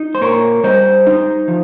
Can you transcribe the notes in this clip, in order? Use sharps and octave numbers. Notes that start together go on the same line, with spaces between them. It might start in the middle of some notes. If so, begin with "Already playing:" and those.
Already playing: D#4
C5
A#2 A#4 C#5
G3 C5 D#5
D#4
F3